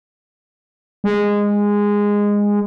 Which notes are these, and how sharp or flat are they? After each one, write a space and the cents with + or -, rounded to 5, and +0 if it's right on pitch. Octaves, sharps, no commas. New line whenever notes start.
G#3 -15